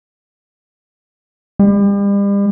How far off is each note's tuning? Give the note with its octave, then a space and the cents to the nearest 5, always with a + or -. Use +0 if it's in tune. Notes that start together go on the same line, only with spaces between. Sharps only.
G3 +40